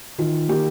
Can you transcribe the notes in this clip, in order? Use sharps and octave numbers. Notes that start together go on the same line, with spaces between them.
D#3 F4
A#3 G4